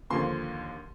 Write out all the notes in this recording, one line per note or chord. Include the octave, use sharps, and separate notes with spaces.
D#2 D3 F3 A#3 C6